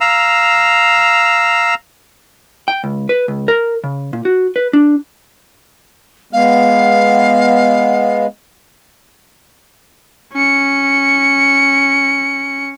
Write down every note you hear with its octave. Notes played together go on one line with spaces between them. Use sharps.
F5 A#5 E6
G5
C#2
B4
C#2
A#4
C#3
A#2
F#4
B4
D4
G#3 B3 F5
C#4 C#7